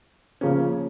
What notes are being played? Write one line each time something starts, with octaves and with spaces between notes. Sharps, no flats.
C#3 F3 A#3 C#4